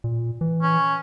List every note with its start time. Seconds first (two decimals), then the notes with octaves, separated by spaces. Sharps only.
0.04 A#2
0.41 E3
0.62 C#4